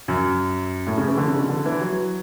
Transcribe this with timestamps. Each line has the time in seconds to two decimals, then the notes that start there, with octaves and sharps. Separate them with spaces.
0.08 F#2
0.87 A2
0.98 C#3
1.08 E3
1.17 D3
1.28 C#3
1.39 B2
1.49 D3
1.65 E3
1.81 F#3